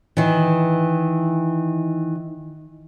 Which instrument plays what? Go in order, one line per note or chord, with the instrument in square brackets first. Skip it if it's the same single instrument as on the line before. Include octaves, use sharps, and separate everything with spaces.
[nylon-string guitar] D#3 E3